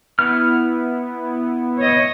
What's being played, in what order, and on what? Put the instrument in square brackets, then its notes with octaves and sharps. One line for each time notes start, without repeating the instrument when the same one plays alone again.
[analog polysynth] B3 E4 [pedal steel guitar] F6
[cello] C#5 D#5